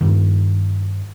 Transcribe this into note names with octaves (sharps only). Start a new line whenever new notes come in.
G2 D#3